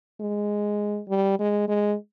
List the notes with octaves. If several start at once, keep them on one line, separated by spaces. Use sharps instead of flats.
G#3
G3
G#3
G#3